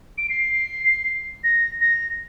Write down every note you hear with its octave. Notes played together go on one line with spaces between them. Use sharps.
D7
C7
A#6
A#6